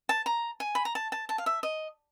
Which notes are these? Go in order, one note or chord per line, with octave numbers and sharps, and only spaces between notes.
A5
A#5
G#5
B5
A#5
A5
A5
A5
F5
E5
D#5